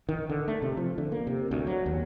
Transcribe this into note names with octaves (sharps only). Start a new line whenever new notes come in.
D#3
D3
A3
C3
F3
D3
A#3
C3
D2
F#3
D#2